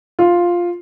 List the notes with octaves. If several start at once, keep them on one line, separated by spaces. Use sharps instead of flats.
F4